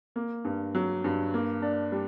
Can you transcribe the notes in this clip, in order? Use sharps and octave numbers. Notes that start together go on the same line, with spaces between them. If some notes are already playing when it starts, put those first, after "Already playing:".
A#3
G2
F#3
G2
A#3
D4
G3